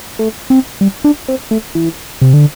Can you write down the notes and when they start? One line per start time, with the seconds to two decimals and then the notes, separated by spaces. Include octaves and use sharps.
0.19 A3
0.50 C4
0.81 G3
1.04 D4
1.28 C4
1.51 A3
1.75 E3
2.21 C3
2.34 D3